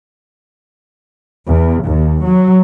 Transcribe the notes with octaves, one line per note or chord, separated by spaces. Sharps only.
E2
D#2
F#3